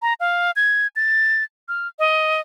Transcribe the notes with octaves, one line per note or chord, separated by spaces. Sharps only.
A#5
F5
G#6
A6
F6
D#5